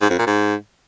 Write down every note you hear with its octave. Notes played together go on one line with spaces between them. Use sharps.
G#2
F2
A#2
G#2